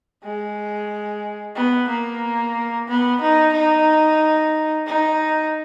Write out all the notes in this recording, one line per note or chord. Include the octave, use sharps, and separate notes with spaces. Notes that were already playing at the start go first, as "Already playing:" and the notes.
G#3
B3
A#3
B3
D#4
D#4
D#4